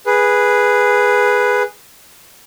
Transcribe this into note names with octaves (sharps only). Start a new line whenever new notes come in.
G#4 B4